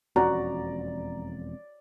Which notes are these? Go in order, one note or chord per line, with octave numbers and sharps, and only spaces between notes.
E1 F2 C#4 F#4 D5 A#5